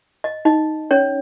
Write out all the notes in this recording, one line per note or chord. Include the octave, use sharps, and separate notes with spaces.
D#5
D#4 D#5
C#4 C#5